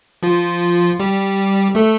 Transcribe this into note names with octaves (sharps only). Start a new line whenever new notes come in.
F3 F4
G3 G4
A3 A4